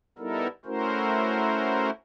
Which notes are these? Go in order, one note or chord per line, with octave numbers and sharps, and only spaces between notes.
G3 B3 D#4 E4 A4 A#4
A3 C#4 E4 F#4 A#4 C5